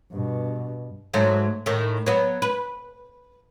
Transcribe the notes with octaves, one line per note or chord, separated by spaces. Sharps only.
G2 B2
G#2 F#3 A3
A2 D#3
F#3 B3
B4